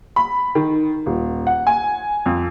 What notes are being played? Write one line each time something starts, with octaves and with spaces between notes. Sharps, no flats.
B5
D#3
D#1
F#5
G#5
F2